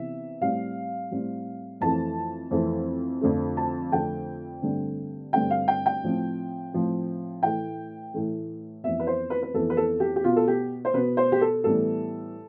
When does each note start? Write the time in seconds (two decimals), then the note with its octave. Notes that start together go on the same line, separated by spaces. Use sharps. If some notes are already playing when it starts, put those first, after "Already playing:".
Already playing: C3 E3 B3 E5
0.41 A2 G3 C4 F5
1.11 A2 G3 C4
1.81 F2 E3 A3 C4 A5
2.51 F2 E3 A3 C4
3.21 F2 D3 F3 A3
3.57 A5
3.92 F2 D3 F3 A3 G5
4.62 G2 D3 A3 C4
5.33 G2 D3 A3 C4 G5
5.51 F5
5.68 G5
5.86 G5
6.03 A2 F3 C4
6.73 A2 F3 C4
7.43 A2 E3 A3 G5
8.14 A2 E3 A3
8.84 F2 E3 B3 E5
9.00 B4
9.07 C5
9.30 B4
9.43 B4
9.54 F2 E3 B3 A4
9.70 B4
9.77 A4
10.00 G4
10.16 G4
10.24 B2 B3 F4
10.36 A4
10.48 G4
10.85 C5
10.94 B2 B3 B4
11.17 C5
11.32 G4
11.41 A4
11.64 A2 E3 G3 B3 A4